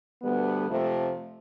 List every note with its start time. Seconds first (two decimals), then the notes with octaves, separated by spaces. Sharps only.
0.22 D2 D3 G3 B3
0.67 F2 C3 F3 A3 C4